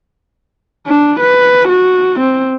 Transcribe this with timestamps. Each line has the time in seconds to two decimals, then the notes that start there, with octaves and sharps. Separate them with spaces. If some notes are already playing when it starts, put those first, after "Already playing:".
0.87 D4
1.20 B4
1.68 F#4
2.20 C4